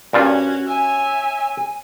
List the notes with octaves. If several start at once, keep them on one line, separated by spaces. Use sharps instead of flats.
G2 A#2 C#4 F4 F#4
C#5 E5 G#5